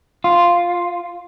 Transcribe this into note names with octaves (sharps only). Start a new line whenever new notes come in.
F4